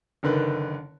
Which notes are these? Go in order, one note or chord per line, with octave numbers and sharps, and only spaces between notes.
F#1 D3 D#3 B4